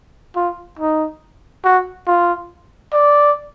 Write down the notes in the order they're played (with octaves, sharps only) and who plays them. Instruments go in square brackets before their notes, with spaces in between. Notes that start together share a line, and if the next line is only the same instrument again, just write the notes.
[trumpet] F4
D#4
F#4
F4
D5